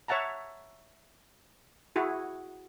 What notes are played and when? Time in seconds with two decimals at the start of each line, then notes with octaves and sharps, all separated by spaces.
0.08 C#5 E5 F#5 A5 A#5
1.96 E4 F#4 G#4